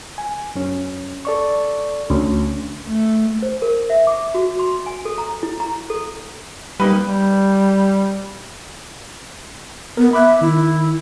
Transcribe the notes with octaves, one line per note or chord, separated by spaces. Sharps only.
G#5
F#2 C#4
A4 D5 C#6
D2 C#4
A3
C5
A#4
E5
D6
F#4
C6
G#5
A4
A#5
E4
A#5
A4
G3 A#3 D#4 B4
G3
B3 A#4
E5 B5 D6 F#6
D#3 E4